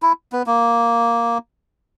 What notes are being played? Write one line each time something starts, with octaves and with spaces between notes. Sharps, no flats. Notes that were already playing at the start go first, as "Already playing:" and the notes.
E4
B3
A#3